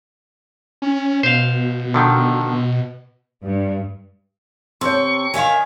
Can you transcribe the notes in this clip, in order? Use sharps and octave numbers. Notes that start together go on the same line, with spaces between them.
C#4
B2 C5 F5
D3 D#3 F3
G2
C3 A4 C#5 C6 C#6
D#3 A#4 E5 F5 G#5